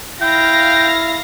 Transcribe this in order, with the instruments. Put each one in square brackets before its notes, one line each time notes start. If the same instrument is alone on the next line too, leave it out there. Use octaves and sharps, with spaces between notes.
[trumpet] E4 [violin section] F5 A#6 [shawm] G5